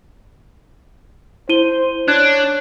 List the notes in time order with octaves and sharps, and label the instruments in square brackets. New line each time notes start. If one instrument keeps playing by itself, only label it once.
[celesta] E4 D#7 G7 [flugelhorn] C5
[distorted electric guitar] D4 [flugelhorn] C#5 [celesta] F#6 G#6 E7